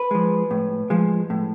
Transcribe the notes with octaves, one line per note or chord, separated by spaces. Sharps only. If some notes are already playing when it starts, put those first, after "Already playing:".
Already playing: B4
F3 G#3
A2
F3 G#3
A2